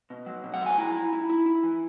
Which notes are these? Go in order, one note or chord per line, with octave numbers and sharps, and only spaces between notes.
B2
F#3
B2
F#5
F#3 G#5
E4 A#5
E4
E4
E4
E4
E3